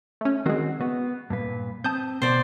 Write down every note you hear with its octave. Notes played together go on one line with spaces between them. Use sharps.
A3 C#4
D#3 G#3 C4 F#4
B3 F#4
G2 A#2 B4
C4 A5 D#6 G6
B2 C5 D5